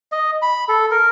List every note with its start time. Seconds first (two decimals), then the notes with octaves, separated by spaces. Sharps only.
0.12 D#5
0.42 B5
0.69 A4
0.91 A#4